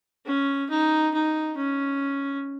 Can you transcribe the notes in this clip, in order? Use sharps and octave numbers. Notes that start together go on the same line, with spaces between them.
C#4
D#4
D#4
C#4